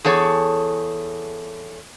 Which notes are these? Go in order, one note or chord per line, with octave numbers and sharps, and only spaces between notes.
E2 G#4 A4 C#5